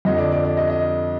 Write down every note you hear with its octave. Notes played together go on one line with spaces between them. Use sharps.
F2 D3 D#5
D5
D5
D5
D#5
D#5